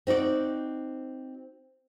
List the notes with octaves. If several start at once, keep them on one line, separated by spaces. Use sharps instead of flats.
C4 D#4 F#4 D5